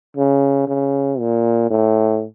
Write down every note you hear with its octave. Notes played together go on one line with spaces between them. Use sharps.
C#3
C#3
A#2
A2